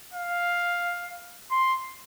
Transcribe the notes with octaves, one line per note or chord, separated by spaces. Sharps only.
F5
C6